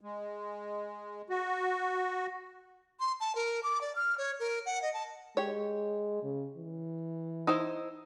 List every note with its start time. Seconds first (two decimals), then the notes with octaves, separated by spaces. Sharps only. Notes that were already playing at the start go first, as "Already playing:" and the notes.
0.01 G#3
1.29 F#4
3.00 C6
3.20 A5
3.35 A#4
3.63 D6
3.81 D5
3.96 F6
4.18 C#5
4.40 A#4
4.66 F#5
4.82 D#5
4.94 A5
5.37 G#3 G4 C#5
6.23 C#3
6.57 E3
7.47 D#4 E4 C5